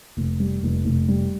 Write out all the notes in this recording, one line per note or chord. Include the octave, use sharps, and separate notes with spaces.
F1
G3
F1
F1
G3